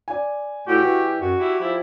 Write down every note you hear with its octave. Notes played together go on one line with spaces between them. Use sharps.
D5 G#5
A2 F#4 G4
E3
F#2 F#4
E4 G4
F3 E4